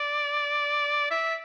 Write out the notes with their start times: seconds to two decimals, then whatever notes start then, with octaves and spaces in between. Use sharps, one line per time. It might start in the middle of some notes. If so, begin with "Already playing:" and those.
Already playing: D5
1.11 E5